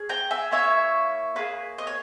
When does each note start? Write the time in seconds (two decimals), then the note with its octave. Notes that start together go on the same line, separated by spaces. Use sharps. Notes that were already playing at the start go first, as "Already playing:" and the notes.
Already playing: C#4 G#4
0.09 G5 A#5
0.31 E5 G#5
0.51 A#3 C#4 E4 C#5 E5
1.36 A#3 C#4 G#4 B4
1.78 D#5
1.87 C#5